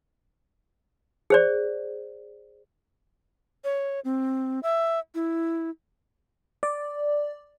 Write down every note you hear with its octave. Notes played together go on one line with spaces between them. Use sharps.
G#4 C5 D5
C#5
C4
E5
E4
D5